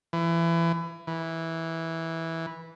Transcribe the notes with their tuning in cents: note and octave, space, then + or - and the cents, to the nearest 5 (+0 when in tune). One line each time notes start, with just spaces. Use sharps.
E3 +25
E3 -10